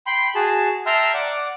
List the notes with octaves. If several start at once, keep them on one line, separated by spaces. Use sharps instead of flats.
G5 B5 C6
F#4 G#4 A5
E5 G5 A5 A#5 C6 F6
D5 F#5 D6